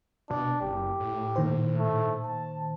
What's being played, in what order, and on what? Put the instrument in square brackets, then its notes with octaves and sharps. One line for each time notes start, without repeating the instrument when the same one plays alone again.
[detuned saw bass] B2 [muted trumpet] D4
[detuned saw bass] F#1 [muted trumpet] G4
[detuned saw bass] A2
[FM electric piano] A#2 D#3 C5
[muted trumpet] A3
A5